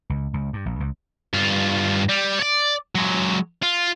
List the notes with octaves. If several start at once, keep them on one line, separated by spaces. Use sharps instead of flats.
C#2
C#2
G2
A#1
C#2
G2 F4
G3
C#5 D5
F#3 G#3
F4